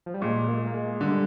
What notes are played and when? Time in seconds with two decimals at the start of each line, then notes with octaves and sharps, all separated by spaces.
0.06 F3
0.14 G3
0.22 A#2 G#3
0.48 A#3
0.67 A#3
0.74 G#3
1.00 D3 G3